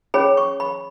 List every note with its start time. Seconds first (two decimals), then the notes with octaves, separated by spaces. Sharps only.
0.14 C#4 G#4 C#5 B5
0.37 C#6
0.60 B5